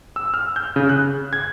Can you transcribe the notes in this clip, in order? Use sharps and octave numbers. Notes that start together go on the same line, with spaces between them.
E6
F6
G6
C#3
F#6
G#6